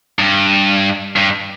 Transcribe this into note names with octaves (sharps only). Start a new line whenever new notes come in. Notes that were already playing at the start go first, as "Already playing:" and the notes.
G2
G2